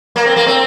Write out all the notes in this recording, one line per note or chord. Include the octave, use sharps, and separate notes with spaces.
A#3
C4
A#3
C4